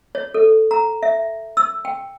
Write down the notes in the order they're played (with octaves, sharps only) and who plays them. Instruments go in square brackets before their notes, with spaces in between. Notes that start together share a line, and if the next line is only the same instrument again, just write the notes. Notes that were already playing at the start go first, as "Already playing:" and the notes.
[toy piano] C#5
A4
A#5
E5
E6
G5